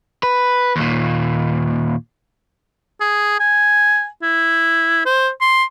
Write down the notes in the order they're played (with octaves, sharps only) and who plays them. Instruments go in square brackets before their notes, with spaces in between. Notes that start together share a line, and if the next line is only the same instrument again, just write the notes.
[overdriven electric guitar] B4
D#2 A#2
[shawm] G#4
G#5
E4
C5
C6